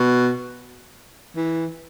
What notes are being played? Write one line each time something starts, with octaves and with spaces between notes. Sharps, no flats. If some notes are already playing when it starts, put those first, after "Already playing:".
Already playing: B2
E3